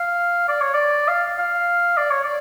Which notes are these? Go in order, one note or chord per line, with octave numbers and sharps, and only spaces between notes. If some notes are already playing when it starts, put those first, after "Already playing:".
Already playing: F5
D5
C#5
D5
F5
F5
D5
C#5
D5